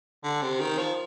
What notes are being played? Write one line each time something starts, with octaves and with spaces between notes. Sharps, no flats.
D3
C3
D#3
F3